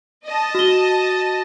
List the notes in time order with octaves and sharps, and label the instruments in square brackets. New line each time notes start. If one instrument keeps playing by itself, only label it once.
[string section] D#5 A5
[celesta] F#4 G7